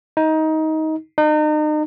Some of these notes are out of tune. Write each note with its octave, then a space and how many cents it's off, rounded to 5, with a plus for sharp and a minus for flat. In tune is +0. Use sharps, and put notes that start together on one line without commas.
D#4 +20
D#4 -35